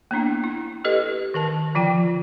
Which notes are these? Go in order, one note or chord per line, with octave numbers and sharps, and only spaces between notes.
A#3 B3 D4 E4
E4
G4 A4 B4 D#5
D#3 A#4 A5
D3 F3 F4 G5